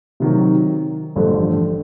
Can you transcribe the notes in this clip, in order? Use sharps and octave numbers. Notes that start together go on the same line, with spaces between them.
C3 D#3 F#3
A1 G2 D3 F3 A3